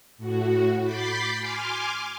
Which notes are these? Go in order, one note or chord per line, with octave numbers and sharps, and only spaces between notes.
A2 F#4
B5 D6 G6 A6 B6 C7
G#5 C6 D6 F6